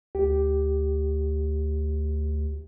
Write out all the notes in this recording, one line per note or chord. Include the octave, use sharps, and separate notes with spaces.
D2 G4